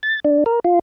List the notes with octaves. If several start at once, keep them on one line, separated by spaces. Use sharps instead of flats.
A6
D4
A#4
F4